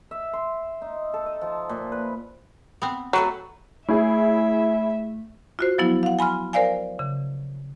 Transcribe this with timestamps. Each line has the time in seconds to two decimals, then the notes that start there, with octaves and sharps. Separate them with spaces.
0.11 E5
0.33 C6
0.82 D#4
1.14 A4
1.26 D#5
1.41 F3
1.69 A#2
1.92 B4
2.82 B3 C4
3.13 F#3 A3 B4 F#5
3.89 A3 E4 G#4 C#5 E5
5.59 F4 F#4 C5
5.78 F3 F#3 B3 E4
6.03 F5 F#5
6.19 G#5 B5 C6 F6
6.53 A#4 C5 D5 F5 G#5
6.99 C#3